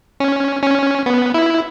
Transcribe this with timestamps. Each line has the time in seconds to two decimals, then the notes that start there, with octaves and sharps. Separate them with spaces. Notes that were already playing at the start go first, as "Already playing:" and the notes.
0.20 C#4
0.63 C#4
1.06 B3
1.34 E4